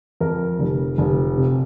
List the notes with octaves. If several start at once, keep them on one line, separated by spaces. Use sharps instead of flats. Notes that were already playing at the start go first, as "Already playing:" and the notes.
F2 A#4
F1
F1
C3